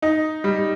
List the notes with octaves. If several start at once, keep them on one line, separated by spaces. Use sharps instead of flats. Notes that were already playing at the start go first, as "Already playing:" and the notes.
D#4
G3